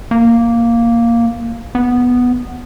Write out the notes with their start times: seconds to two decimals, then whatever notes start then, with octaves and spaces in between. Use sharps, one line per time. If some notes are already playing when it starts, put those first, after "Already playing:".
0.11 A#3
1.75 B3